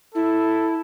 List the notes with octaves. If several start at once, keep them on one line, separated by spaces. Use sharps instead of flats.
E4 A4